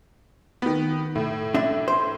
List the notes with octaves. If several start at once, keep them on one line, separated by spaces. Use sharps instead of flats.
D#3 B3
A2
D4 E5
C5